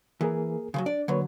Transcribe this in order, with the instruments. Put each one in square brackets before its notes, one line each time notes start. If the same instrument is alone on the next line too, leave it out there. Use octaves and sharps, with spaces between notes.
[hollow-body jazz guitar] E3 [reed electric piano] A#3 G#4 A#4
[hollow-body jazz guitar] C#3 F3 F#3
[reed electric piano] D4 [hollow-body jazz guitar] D5
[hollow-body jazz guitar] D3 F#3 [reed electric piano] A#3 B4 C#5